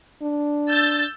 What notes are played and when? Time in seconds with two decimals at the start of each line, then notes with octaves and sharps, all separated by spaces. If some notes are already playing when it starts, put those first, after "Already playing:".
0.22 D4
0.68 E6 G6 A6